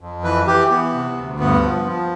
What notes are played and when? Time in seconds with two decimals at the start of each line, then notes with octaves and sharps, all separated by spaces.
0.01 F2
0.23 E3 B4
0.47 E3 G4
0.70 E3 B3
0.93 C3
1.17 D2
1.39 G2 B3
1.62 F3
1.86 F3